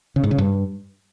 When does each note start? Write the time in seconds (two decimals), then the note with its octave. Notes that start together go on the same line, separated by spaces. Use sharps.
0.16 C#3
0.23 G#2
0.31 C#3
0.38 G2